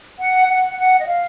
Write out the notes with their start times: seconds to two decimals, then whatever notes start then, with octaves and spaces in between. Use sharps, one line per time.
0.19 F#5
0.48 F#5
0.77 F#5
0.99 D#5
1.07 F5